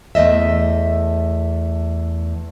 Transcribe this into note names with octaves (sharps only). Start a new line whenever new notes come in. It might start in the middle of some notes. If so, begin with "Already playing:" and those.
E2 A3 D#5 E5